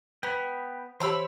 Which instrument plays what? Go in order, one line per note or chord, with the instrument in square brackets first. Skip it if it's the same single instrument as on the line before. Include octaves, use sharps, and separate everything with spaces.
[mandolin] B3 [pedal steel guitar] G5 B5
[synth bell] E3 G4 [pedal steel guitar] C5 [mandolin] C#5 B5 E6